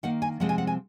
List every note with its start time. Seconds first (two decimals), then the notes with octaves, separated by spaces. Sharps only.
0.03 D#3 A#3 F#5
0.22 G#5
0.40 C3 F3 G#3 C4 F#5
0.49 G#5
0.58 F#5
0.67 G#5